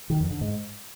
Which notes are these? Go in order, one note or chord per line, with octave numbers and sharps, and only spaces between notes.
D#3
F2
D3
G#2